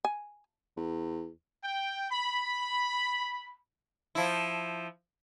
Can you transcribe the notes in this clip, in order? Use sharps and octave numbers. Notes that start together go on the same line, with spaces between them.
G#5
E2
G5
B5
F3 E4